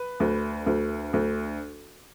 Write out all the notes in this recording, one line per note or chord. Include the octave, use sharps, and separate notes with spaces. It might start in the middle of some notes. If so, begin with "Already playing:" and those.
Already playing: B4
D2
D2
D2